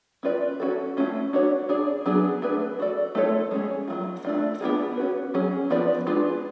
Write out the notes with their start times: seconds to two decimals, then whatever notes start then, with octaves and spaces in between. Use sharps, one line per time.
0.23 C#4 F4 B4 D5
0.60 C#4 F#4 A4
0.97 A3 C#4 F4
1.33 D4 F#4 C#5
1.69 D4 G#4 D5
2.06 F#3 B3 D4 G#4
2.42 A3 D4 G#4 B4
2.79 D4 F#4 A4 D5
3.15 A3 D4 F4 A4 C#5
3.51 G#3 C#4 G#4
3.88 F#3 A3 F4
4.25 A3 D4 F4
4.61 B3 D4 F4 G#4
4.97 C#4 F#4 B4
5.34 F#3 C#4 G#4
5.70 F3 B3 F4 B4 D5
6.07 G#3 D4 F4 G#4 B4